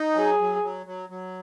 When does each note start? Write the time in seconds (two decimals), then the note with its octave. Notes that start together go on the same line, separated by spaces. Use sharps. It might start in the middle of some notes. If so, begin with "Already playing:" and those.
Already playing: D#4
0.15 F#3 G#4
0.40 F#3
0.63 F#3
0.86 F#3
1.10 F#3